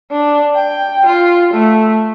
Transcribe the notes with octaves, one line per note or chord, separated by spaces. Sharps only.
D4
G5
F4
A3